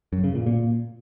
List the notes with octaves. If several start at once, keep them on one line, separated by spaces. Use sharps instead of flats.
F#2
C#3
A#2
A#2